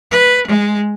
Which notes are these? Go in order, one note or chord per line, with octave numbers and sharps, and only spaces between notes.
B4
G#3